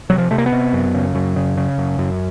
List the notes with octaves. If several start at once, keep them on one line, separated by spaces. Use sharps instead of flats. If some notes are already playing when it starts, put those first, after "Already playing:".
C3 F#3
F3
C3 A3
A#3
B3
C3
F#2
C#3
F#2
C#3
C#3
F#2
F#2